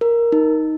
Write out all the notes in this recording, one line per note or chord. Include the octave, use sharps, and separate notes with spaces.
A#4
D#4